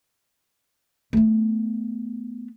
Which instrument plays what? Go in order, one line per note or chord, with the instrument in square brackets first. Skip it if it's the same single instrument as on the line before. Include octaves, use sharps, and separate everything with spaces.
[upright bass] A3 B3